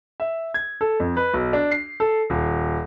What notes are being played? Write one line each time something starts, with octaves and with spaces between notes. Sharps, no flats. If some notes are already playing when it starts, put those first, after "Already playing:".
E5
G#6
A4
F2
B4
B1
D4
C7
A4
D#1